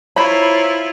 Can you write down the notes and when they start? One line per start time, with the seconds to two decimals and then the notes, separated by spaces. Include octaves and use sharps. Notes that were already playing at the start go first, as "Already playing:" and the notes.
0.16 E4 F4 C5 C#5 A#5 B5